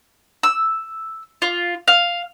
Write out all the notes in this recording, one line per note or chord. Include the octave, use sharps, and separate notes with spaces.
E6
F4
F5